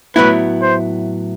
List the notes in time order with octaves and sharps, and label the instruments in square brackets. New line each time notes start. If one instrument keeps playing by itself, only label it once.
[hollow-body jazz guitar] A2 F#3 B3 E4 [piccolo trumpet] B4
[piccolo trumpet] C5